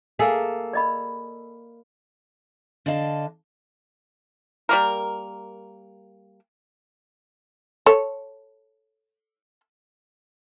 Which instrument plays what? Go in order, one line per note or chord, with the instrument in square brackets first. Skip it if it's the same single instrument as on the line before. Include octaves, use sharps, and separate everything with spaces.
[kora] A#3 A4 E5 [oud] G#4
[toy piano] D5 D#5 B5
[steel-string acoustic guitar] D3 D4 D#5 F5 A5
[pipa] G3 A#3 A#4
[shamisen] A4 C#5